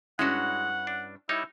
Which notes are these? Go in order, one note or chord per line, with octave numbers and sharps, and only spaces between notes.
G2 G#3 C#4 E4 F#4 F#5
D4
G3 D#4 E4 C#5